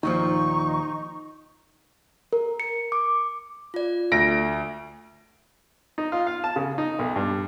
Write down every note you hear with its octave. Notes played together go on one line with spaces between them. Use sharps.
D#2 A#2 F3 D#4 C#6
A#4
C#7
D6
F4 D5
D2 A#6 D7
D#4
F4
F5
A5
C#3
D#4
B1
G2